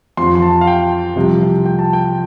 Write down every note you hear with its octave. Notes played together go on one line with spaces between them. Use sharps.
F2 C6
F3
C6
A5
F5
G5
C2 C3 F3
G5
A5
G5